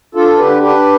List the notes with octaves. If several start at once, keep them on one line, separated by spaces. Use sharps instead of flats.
D4 F4 A4
D3 G4 B4
D4 G4 B4